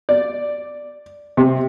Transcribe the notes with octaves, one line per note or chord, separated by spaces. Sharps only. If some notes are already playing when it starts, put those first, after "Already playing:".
D5
C3